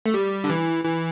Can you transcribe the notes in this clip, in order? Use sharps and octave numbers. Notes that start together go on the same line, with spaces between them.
A3
G3
D3
E3
E3